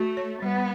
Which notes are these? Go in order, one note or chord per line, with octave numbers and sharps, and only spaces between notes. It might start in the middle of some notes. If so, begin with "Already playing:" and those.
Already playing: A3 F#4
C#5
G3 B3